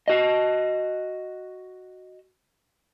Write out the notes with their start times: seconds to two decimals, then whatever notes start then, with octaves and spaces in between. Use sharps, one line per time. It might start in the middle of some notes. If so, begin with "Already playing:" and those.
0.08 F#4 D#5